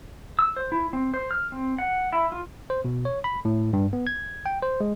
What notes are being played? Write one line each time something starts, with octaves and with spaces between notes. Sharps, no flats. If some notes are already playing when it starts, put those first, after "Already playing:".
E6
C5
E4
C4
C5
F6
C4
F#5
E4
F4
C5
B2
C#5
B5
A2
G2
B3
G#6
G5
C5
G#3